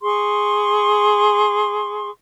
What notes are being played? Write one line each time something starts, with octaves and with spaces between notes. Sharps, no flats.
G#4 C6 C#6